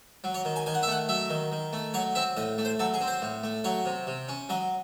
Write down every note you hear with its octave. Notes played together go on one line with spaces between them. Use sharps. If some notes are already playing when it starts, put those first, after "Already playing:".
F#3
C#5
D#3
G#5
D#3 G#5
F#5
E5
A3 F#5
F#3 E5
D#3
D#3
A3
F#3 C#5
C4 E5
A2 D#5
A3
C5
F#3 A4
G#4
C4
C5
A2
A3
F#3 C#5
C3
C3
C#4
F#3 D#5